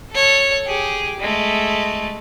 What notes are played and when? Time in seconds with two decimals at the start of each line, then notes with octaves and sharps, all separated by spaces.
0.11 A4 C#5
0.66 G4 G#4
1.20 G#3 A3